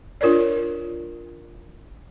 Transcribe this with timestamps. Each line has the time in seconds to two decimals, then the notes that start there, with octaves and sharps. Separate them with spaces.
0.21 D4 F4 A#4 C#5 D5